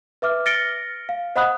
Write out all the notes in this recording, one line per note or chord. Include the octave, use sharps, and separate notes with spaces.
B4 E5 D6 F6
F6 A6 A#6 C#7 D7 G7
F5
C5 D#5 F#5 B5 D#6 F#6